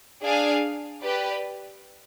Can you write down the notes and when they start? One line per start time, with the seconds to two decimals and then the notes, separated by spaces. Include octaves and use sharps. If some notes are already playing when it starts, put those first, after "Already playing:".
0.22 D4 G#4 D5 F5 G#5
1.01 G4 B4 D5